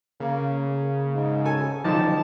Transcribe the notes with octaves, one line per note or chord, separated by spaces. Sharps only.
C#3 A#3
A#3
G#2
A4 G#5
F#1 D3 D#3 F3 A5